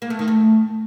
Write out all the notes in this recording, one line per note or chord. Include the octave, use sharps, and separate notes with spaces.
A#3
A3
D#3
A3